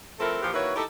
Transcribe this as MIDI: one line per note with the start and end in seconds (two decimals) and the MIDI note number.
0.19 0.40 53
0.19 0.40 57
0.19 0.40 60
0.19 0.40 64
0.19 0.40 69
0.19 0.40 70
0.42 0.51 46
0.42 0.51 52
0.42 0.51 53
0.42 0.51 65
0.42 0.51 67
0.53 0.75 51
0.53 0.75 58
0.53 0.75 64
0.53 0.75 66
0.53 0.75 71
0.53 0.75 73
0.75 0.84 63
0.75 0.84 64
0.75 0.84 67
0.75 0.84 69